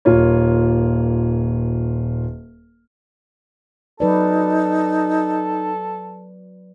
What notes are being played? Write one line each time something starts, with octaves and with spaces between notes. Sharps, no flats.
D#1 A#3 F4 C#5
F#3 D#4 A4 B4 D5